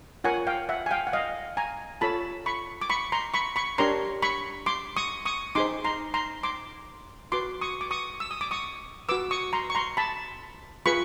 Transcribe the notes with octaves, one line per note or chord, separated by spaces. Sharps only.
F4 A#4 C#5 F#5 G#5
F5 G5
E5 F#5
G#5
F5 G5
F#5
D#5 F5
G#5 A#5
F4 A4 C#5 A5 B5
B5 C#6
D6
B5 C#6
A#5 C6
B5 C#6
B5 C#6
D4 G4 A#4 C#5 A#5 C6
B5 C#6
C6 D6
C#6 D#6
C#6 D#6
D#4 G#4 C5 C6 D6
A#5 C6
A#5 C6
C6 D6
F#4 B4 C6 D6
C#6 D#6
D6
C#6 D#6
E6
D#6
D6
C#6 D#6
F#4 B4 D6 E6
C#6 D#6
A#5 C6
C#6
A#5 C6
A5 B5
F4 G#4 B4 B5 C#6